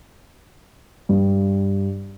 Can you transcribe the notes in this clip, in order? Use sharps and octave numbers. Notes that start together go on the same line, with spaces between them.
G2